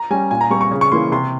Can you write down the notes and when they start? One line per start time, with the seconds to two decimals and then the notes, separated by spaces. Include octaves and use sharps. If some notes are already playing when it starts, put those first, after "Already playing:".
Already playing: A#5
0.10 G3 C#4 G#5
0.31 A#2 G#5
0.41 A#5
0.50 G3 C4 C#6
0.61 C#6
0.71 C#3
0.81 C#6
0.92 E3 A#3 C6
1.12 C3 C6